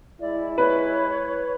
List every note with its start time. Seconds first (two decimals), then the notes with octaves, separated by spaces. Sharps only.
0.21 G#3 E4 D5
0.58 B4 C#5